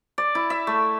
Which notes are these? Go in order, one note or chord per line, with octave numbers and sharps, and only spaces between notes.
D5
E4
E5
A3